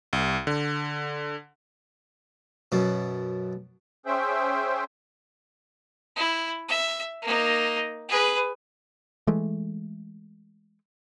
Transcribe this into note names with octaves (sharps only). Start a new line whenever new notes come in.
C2
D3
F#2 B2
C#4 G#4 C5 E5 G5
E4
E5
A#3 D#4
G#4 B4
E3 G#3 A3